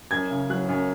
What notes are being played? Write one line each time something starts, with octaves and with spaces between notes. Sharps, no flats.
F#2 G#6
C#3
F#3 F#6
F#2